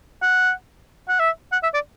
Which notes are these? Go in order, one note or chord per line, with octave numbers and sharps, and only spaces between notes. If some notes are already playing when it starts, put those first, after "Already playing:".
F#5
F#5
E5
F#5
E5
D5